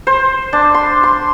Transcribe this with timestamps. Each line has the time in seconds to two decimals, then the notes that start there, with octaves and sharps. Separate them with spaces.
0.07 C5
0.53 D4
0.74 C6
1.03 C6